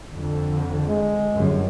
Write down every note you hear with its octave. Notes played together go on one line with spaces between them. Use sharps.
F2 D3
G#3
G1 F#2